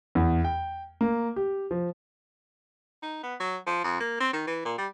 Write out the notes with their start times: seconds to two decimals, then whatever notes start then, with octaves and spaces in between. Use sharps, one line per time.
0.15 E2
0.44 G5
1.01 A#3
1.36 G4
1.71 F3
3.03 D#4
3.23 B3
3.40 F#3
3.67 F3
3.84 F2
4.00 A#3
4.20 C4
4.33 D#3
4.47 E3
4.65 A#2
4.78 G3